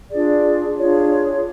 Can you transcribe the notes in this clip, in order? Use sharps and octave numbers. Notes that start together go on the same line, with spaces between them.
D4 F4 G#4 D5
D4 F4 G#4 C#5